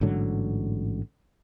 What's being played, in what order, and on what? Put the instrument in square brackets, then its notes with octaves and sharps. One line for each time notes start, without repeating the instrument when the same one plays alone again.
[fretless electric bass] A1 G#2 D3 F#3